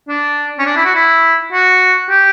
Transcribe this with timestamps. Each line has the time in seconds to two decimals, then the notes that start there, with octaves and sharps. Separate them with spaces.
0.08 D4
0.59 C#4
0.66 D4
0.76 E4
0.85 F#4
0.95 E4
1.52 F#4
2.10 G4